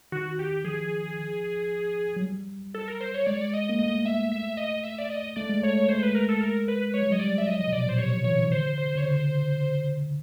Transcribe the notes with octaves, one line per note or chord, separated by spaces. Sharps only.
D#3 F#4
G4
F3 G#4
F#3
G3
A4
A#4
C5
C#5
G#3 D5
C#5
D5
D#5
A#3
A3 D#5
E5
E5
D#5
E5
D5
D#5
A3 D5
G#3
A3 C#5
A3 C#5
G#3 C5
B4
A#4
A4
A#4
B4
G#3 C#5
G3
F#3 D#5
G3 D5
E5
F#3 D#5
F3 D#5
C3
B2 D5
A#2
B2 C5
C3 C#5
F3
E3 C#5
D#3
D3 C5
C5
C#3 C#5
D3 C5